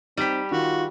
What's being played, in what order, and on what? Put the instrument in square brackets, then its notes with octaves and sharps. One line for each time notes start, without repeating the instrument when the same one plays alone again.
[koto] G3 G4 [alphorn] C4 [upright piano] D#4 B6
[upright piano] D#3 [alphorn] F4 [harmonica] F#4